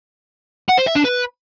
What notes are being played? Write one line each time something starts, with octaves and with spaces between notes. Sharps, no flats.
F#5
C5
E5
D4
B4